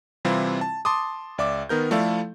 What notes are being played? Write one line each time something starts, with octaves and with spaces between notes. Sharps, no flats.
C3 E3 G3 C4 E4 F4
A5
A5 C6 D6 D#6
C#2 D5 E5 D6
D#3 B3 A#4 G6
F3 A3 E4 A4 D5 F5